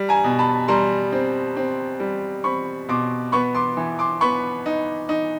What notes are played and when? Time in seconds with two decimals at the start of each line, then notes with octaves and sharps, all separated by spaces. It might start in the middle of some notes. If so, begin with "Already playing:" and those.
Already playing: G3
0.09 G#5 A#5
0.24 B2
0.39 A5 B5
0.68 G3 A#5 C6
1.12 C4
1.57 C4
2.00 G3
2.44 C4 B5 C#6
2.88 B2 C6 D6
3.32 B3 B5 C#6
3.55 C6 D6
3.77 E3
3.99 C6 D6
4.21 B3 B5 C#6
4.66 D#4
5.09 D#4